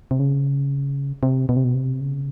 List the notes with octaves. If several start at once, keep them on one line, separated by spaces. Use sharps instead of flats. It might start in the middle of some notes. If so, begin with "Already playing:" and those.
C3
C#3
C3
B2
C3
B2
C3
C#3